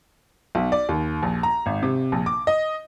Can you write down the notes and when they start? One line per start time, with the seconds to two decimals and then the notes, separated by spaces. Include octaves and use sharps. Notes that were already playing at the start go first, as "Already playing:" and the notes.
0.55 B1
0.72 D5
0.89 D#2
1.23 A#1
1.43 A#5
1.66 G#1
1.83 C3
2.12 A#1
2.26 D6
2.47 D#5